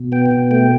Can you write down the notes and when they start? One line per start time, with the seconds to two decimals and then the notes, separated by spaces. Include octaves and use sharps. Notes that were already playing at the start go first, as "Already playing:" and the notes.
Already playing: B2
0.12 B3 G5
0.26 G5
0.31 B2
0.51 A3 G5